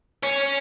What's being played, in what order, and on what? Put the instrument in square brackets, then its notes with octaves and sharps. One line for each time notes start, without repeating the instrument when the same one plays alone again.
[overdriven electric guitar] C#4